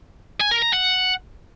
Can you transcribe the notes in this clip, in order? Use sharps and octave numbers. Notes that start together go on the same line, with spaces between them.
G#5
A#4
A#5
F#5